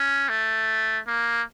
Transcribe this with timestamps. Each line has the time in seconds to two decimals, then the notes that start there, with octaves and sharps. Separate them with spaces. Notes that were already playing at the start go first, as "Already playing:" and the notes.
Already playing: C#4
0.29 A3
1.07 A#3